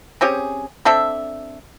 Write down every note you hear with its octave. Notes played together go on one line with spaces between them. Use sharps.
C4 C#4 G4 G#4
C4 D4 A4 E5